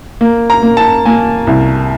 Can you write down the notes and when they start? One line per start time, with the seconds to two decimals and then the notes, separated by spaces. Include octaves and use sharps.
0.21 A#3
0.50 A#5
0.63 A#3
0.77 A5
1.05 A#3 G#5
1.47 C2